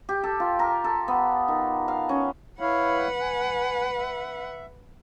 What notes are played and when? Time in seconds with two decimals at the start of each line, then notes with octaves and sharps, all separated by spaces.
0.09 G4
0.24 A4
0.40 F4
0.59 A#4
0.84 A4
1.08 B3
1.48 D#3
1.88 F5
2.09 C#4
2.60 E4 B4 C#5 F5 F#5
3.21 G#5
3.97 E5